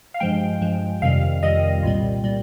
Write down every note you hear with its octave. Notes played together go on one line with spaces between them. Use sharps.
F5
G2 F3 G#3 G5
G2 F3 G#3
F2 C3 D#3 G3 F5
F2 C3 D#3 G3 D#5
C2 A#2 G3
A#2 G3